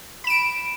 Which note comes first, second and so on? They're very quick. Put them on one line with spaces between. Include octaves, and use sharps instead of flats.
B5 E7 D7